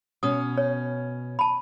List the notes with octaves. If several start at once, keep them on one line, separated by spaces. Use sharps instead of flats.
B2 C#4 D#6
C#5
A5 B5